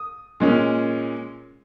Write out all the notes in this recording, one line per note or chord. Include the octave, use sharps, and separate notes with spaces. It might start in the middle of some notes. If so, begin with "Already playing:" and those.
Already playing: D#6
A#2 G#3 C#4